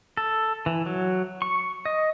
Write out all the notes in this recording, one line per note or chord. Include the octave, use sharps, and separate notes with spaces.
A4
E3
F#3
C#6
D#5